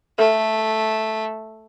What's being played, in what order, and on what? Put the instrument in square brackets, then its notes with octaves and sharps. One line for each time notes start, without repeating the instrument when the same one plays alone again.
[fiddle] A3 [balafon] A4 E5